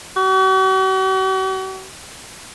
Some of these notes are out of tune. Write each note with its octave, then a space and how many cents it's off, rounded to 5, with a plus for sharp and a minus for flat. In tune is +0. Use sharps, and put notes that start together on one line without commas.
F#4 +45